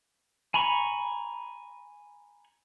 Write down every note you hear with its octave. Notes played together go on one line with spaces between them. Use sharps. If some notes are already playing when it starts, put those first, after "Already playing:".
G#5 A#5 B5 C#6